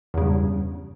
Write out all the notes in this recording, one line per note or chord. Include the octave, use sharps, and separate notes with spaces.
E2 G2 C#3